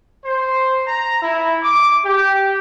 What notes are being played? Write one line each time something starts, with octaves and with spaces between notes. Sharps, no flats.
C5
A#5
E4
D6
G4